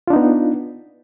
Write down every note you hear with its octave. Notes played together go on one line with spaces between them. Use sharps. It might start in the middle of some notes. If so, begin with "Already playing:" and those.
B3 D4 D#4 F4